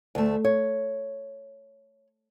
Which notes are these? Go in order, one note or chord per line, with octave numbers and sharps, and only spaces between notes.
D2 A3
C#5